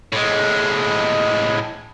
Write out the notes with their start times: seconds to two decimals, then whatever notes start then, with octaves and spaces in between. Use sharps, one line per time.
0.12 A2 G#3